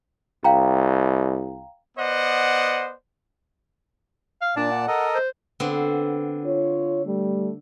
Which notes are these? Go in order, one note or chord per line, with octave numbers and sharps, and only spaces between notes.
C2 F5 G5 A#5
B3 C5 D5 D#5 F#5
F5
A#2 D4 D5 A5
F#5
A4 A#4 D#5
C5
D3 B3 C4
F4 C#5
G3 A3